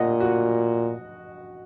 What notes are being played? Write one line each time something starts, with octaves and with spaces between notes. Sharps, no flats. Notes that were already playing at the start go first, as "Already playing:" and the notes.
Already playing: A#2 D#5 F#5
F#4